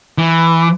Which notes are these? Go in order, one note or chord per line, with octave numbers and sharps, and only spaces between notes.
E3